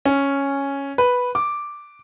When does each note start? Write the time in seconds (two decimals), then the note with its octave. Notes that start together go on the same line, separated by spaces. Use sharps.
0.05 C#4
0.98 B4
1.35 D6